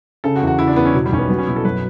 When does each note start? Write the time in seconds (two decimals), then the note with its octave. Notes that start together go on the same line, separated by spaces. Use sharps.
0.24 C#3 A4
0.36 F#4
0.42 E2
0.47 F#4
0.59 C#3 E4
0.67 D4
0.76 E2 B3
0.85 C#4
0.94 B2 F#3
1.06 G3
1.12 B1 C#4
1.18 B3
1.29 F#3 B3
1.38 C#4
1.47 B2 E4
1.56 A4
1.64 F#2 B4